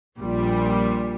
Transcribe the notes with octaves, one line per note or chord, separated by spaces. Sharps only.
A#1 A#2 G3